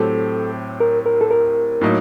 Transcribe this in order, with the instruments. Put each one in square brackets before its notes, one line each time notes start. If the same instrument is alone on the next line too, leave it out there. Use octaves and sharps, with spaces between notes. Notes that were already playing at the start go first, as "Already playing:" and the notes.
Already playing: [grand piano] A2 F#3 C4 G4 [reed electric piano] A4
[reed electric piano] A#4
A#4
A4
A#4
[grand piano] A2 F#3 A#3 D#4